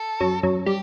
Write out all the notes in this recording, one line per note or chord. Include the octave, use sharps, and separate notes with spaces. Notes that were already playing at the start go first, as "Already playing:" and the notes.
Already playing: A4
F#2 F#3
F#2 F#3
G3 G4